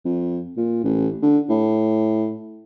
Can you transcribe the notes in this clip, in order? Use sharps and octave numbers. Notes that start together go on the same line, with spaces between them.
F2
A#2
A1
D3
A2